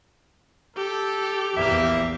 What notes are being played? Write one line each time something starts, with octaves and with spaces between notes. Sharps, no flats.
G4 A4
A#1 E2 A#3 E5